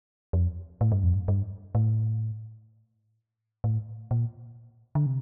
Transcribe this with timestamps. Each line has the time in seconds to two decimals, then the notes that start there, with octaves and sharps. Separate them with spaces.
0.33 F2
0.81 A2
0.92 G2
1.03 F2
1.14 G2
1.28 G2
1.75 A2
3.64 A2
4.11 A#2
4.95 D3
5.06 C3